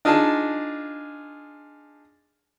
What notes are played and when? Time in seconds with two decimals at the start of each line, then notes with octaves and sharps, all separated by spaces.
0.05 D4 D#4 F4 G#4 A5